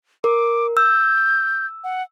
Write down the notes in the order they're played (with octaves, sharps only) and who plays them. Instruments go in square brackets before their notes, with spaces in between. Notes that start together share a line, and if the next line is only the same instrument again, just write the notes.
[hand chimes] A#4 [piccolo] D6
[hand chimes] E6 [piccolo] G6
[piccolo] F#5